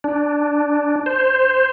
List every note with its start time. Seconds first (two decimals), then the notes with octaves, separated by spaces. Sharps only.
0.04 D4
1.06 C5